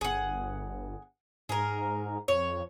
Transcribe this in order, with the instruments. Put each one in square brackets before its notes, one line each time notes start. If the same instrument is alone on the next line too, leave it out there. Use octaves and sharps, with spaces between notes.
[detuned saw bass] G1 [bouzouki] G#4 F#5
[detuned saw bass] G#2 [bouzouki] G#4 A#4
[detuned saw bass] F2 [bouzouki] C#5